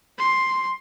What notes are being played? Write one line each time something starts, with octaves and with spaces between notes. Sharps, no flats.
C6